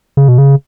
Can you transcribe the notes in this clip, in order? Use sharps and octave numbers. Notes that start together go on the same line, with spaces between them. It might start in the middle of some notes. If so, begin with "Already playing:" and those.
C#3
B2
C#3